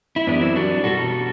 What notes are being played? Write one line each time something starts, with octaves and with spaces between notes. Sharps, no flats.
E4
F#2 E3 G3 B3 D4
C4 E4
D4 F#4
B2 G3 F#4 A4